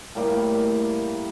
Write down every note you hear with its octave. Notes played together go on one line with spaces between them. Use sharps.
A2 G3 A#3 D6